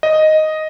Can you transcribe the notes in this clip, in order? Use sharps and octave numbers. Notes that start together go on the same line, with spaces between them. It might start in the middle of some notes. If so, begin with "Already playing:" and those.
D#5